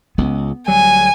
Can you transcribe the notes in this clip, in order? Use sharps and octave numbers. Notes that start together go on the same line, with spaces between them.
C#2 B3
D2 F#3 G3 G#5